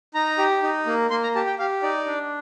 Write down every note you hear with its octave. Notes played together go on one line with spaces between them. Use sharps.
D#4 A#5
G4
D#4
A#3
A#3 C6
A#5
G4 A5
G5
G4 F5
D#4 D5
D4